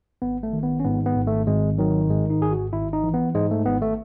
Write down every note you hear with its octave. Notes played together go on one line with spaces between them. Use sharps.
G#1 B3
A3
D#3
B3
C#4
G#2 B3
B3
G#1
A3
G#1 G#3
D#3 F#3
G#2 G#3
D#4
G#1 G#4
F#4
G#1 E4
D#4
E3
B3
G#2 G#3
A3
G#1 B3
A3